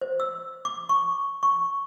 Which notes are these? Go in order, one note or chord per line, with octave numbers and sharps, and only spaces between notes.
C5
E6
D6
C#6
C#6